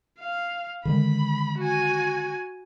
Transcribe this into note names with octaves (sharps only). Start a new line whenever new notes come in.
F5
D3 D#3 G#3 B5
F#4 G#5